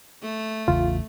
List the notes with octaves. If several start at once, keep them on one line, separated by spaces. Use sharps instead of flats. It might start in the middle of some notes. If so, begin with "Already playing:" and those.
A3
A1 E2 C#3 F4